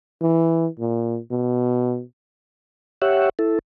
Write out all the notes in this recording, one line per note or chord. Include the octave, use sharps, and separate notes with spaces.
E3
A#2
B2
G4 C#5 E5 F#5
E4 A4